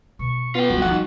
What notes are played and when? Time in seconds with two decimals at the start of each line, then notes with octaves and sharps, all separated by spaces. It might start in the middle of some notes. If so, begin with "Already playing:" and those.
0.19 B2 C#6
0.55 B3 F4 G5
0.70 G3 B3 F#4
0.82 F2 G3 D#4 F#5